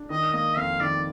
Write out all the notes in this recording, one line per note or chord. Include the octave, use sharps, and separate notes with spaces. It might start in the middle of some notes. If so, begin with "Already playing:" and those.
Already playing: D4
D#3 D#5
A#3 D#5
F2 F5
D#3 D5